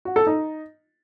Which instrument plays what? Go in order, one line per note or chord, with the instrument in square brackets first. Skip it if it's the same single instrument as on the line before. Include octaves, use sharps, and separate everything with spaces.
[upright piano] F#4
A4
D#4